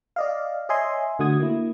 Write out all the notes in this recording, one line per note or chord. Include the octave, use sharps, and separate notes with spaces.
D5 D#5 F5
C#5 D#5 E5 G#5 C6
D3 A3 F#4 D#6 G#6
A#3 E4